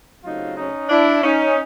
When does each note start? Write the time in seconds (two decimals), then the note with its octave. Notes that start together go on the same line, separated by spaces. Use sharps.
0.23 C#3 F#3 A3 C4 D#4 F4
0.56 C#4 D#4
0.89 D4 E4
1.24 C#4 D#4